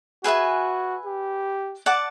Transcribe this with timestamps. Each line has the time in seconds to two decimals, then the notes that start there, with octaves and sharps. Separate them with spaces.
0.24 F#4 G#4 B4 E5 G#5
1.05 G4
1.86 D5 F#5 A5 D6